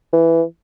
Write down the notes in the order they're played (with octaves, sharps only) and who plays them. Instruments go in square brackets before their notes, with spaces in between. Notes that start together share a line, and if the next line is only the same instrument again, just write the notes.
[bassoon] E3